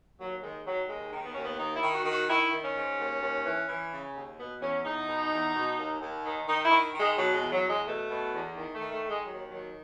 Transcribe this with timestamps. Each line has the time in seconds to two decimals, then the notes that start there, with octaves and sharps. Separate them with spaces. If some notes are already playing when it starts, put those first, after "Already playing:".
0.19 D#2 F#3
0.43 D#3 G#3
0.66 D#3 F#3
0.89 D#2 G#3
1.13 D#3
1.24 B3
1.34 D#2 C#4
1.44 B3
1.59 D#3 D#4
1.76 E4
1.82 D#3
1.94 F#4
2.05 D#3
2.12 F#4
2.29 D#3 E4
2.52 D#3
2.63 C#4
2.75 G#2
2.98 D#2
3.22 D#2
3.45 E3
3.68 E3
3.92 C#3
4.15 D#2
4.38 B2 B3
4.61 E2 C#4
4.84 E2 D#4
5.08 B2
5.31 E2
5.54 B2
5.77 D#2
6.01 D#2
6.25 D#3
6.47 D#3 D#4
6.65 E4
6.71 D#3
6.94 D#3
7.00 G#3
7.17 B2 F#3
7.34 G#3
7.40 E2
7.52 F#3
7.63 E2
7.69 G#3
7.87 B2 A3
8.10 B2
8.33 E2
8.57 D#3
8.75 D#3 A3
8.92 A3
9.03 D#3
9.09 G#3
9.26 D#2 F#3
9.49 D#3 F#3